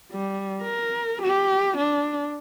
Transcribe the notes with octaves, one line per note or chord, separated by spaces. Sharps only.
G3
A#4
G4
D4